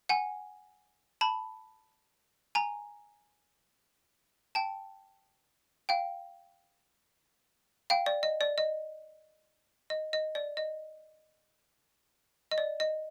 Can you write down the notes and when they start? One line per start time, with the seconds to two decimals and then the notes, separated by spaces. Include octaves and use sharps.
0.09 F#5 G#5
1.21 A5 B5
2.55 G#5 A#5
4.55 G5 A5
5.89 F5 G5
7.90 F5 G5
8.06 D5
8.23 D#5
8.41 D5
8.58 D#5
9.90 D#5
10.13 D#5
10.35 D5
10.57 D#5
12.52 D#5
12.58 D5
12.80 D#5